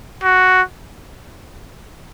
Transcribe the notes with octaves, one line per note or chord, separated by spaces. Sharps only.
F#4